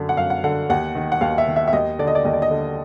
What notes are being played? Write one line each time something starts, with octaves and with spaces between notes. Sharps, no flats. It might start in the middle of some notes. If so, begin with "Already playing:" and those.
Already playing: F#2 D3
F#5
F#2 F5
F#5
D3 F#5
D#2 F#5
D#3
F#5
D#2 F5
E5
D#3
E5
E5
D#2 D#5
D3 D5
D#5
D5
D#2 D#5
D5
D#5
D3